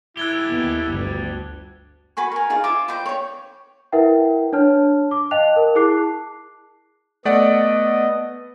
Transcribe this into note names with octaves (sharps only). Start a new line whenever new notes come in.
E4 G4 A4 F#6 G#6 G7
D#2 B3
G1 D2
F#4 B4 G#5 C#6
A#4 G#5
D#4 F4 G#4 F5
F4 C5 E5 D6
B4 C5 D#5 G5
C#5 G5
E4 A#4 B4 E5 F#5 G5
D4 C#5 A5 F6
D6
D#5 F5 G5 A5 F#6 F7
A#4
E4 G#4 A5 D6 F#6 C7
A3 B3 D5 D#5 F#5